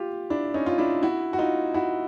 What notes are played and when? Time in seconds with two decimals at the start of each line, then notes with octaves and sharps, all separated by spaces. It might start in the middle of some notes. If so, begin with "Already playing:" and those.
Already playing: F4 G4
0.30 D4 E4
0.54 C#4 D#4
0.66 F4
0.78 D4 E4
1.03 E4 F#4
1.33 F#4
1.38 D#4 F4
1.74 E4 F#4